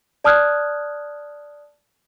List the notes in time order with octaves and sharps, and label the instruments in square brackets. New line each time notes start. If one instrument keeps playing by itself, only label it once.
[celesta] D5 A5 D#6 F6 F#6 G#6